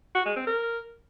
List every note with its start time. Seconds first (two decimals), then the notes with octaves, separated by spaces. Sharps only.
0.15 F#4
0.25 G#3
0.36 C4
0.47 A#4